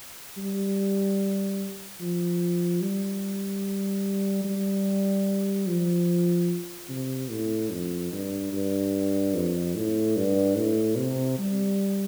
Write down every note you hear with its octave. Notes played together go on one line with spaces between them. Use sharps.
G3
F3
G3
G3
F3
C3
A2
F2
G2
G2
F2
A2
G2
A2
C3
G3